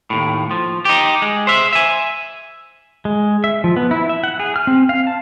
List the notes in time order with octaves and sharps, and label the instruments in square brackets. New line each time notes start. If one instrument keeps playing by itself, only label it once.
[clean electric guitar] D#2 A2
F3
D#4 G4
G#3
C5 E5
E5 G#5
[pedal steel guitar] G#3
E5
F3
B3
E4
E5
F#5
G#4
F6
C4
F5
A5